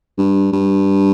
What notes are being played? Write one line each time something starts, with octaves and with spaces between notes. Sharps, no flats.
G2
G2